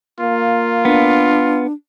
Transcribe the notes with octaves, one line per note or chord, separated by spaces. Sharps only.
A#3 F4
B3 D4